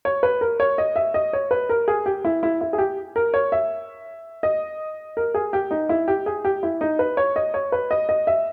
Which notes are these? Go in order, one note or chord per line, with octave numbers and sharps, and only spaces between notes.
C#5
B4
A#4
C#5
D#5
E5
D#5
C#5
B4
A#4
G#4
G4
E4
E4
E4
G#4
G4
A#4
C#5
E5
D#5
A#4
G#4
G4
D#4
E4
G4
G#4
G4
E4
D#4
B4
C#5
D#5
C#5
B4
D#5
D#5
E5